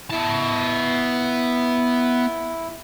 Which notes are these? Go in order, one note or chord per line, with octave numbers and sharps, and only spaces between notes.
B3 E4 A5